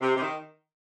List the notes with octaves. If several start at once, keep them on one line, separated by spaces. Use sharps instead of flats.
C3
C3
D#3